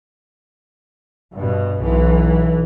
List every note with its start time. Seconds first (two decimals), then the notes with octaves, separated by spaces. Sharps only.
1.34 G2 B2
1.80 B1 E3